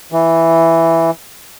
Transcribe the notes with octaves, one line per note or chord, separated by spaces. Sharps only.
E3